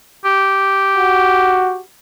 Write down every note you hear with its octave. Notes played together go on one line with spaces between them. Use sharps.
G4
F#4